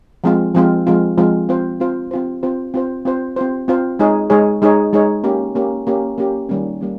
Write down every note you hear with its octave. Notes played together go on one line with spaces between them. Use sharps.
F3 G#3 C4 F4
F3 G#3 C4 F4
F3 G#3 C4 F4
F3 G#3 C4 F4
C4 F4 C5
C4 F4 C5
C4 F4 C5
C4 F4 C5
C4 F4 C5
C4 F4 C5
C4 F4 C5
C4 F4 C5
G#3 D#4 G#4 C#5
G#3 D#4 G#4 C#5
G#3 D#4 G#4 C#5
G#3 D#4 G#4 C#5
A#3 C#4 G4
A#3 C#4 G4
A#3 C#4 G4
A#3 C#4 G4
D#3 G3 A#3 C#4
G3 A#3 C#4